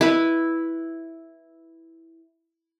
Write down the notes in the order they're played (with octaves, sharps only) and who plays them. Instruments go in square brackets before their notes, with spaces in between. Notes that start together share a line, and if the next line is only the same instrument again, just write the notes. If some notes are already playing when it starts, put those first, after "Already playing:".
[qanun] E4 B4